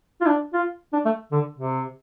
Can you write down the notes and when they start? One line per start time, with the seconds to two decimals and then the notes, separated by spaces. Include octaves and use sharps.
0.21 F4
0.27 D4
0.54 F4
0.93 D4
1.05 A3
1.32 D3
1.59 C3